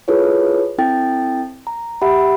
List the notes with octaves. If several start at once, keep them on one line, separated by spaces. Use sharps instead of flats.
E4 F4 G#4 A4 B4 C#5
C4 E4 A4 G5 A6
A#5
G4 E5 F#5 B5